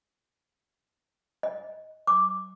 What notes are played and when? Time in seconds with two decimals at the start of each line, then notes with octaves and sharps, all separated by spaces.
1.43 D#5
2.07 D6